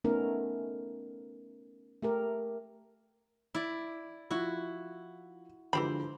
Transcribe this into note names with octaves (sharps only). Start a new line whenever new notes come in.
A3 B3 C#4 D#4 A#4
A3 G4 A#4
E4 D5
F3 E4 F#4
D3 E3 F3 G#3 G4 C5 B5